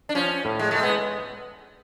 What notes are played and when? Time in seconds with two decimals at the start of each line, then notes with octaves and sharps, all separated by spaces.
0.09 D4
0.15 F3 C#4
0.45 A2
0.59 G#3
0.71 G#3 A3
0.83 B3